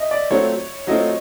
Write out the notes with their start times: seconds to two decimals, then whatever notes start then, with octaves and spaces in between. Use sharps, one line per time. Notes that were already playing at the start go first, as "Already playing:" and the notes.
Already playing: D#5 E5
0.11 D5
0.30 F#3 A3 C4 F4 C#5
0.87 F#3 A3 C4 F4 D#5